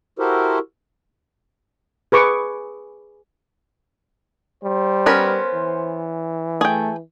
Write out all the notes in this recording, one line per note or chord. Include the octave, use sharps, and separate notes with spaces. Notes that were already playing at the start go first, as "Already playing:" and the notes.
E4 F#4 G4 A4 A#4 C5
G#4 B4 C#6 D6
G3 C5
B3 C#4 A#4
E3
A3 G#4 G5